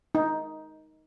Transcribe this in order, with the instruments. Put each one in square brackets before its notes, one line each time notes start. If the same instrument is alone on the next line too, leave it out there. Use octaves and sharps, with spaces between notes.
[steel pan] D#4